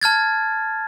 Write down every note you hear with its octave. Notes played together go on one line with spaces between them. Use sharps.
A5 F6 G#6 A6